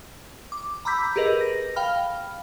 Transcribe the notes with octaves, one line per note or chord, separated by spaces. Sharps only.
D6
A#5 B5 D6 E6 G6 B6
G4 G#4 A#4 B4 D#5
A#6
F5 G5 B5 F6